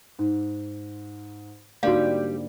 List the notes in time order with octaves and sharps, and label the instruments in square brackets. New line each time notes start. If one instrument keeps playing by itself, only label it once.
[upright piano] G#2
[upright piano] G#2 D3 A#3 [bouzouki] G3 [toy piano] F#4 F5